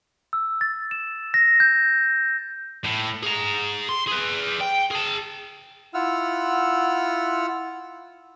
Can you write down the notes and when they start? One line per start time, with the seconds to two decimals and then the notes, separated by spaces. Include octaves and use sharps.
0.33 E6
0.61 A6
0.91 E7
1.34 A#6
1.60 G6
2.85 A2
3.23 G#4 A#5
3.89 C6
4.07 G#4 B4
4.60 G5
4.91 G#4 A5
5.94 E4 F4 F#5 E6 F6